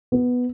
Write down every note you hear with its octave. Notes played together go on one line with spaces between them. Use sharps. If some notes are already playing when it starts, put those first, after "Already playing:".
B3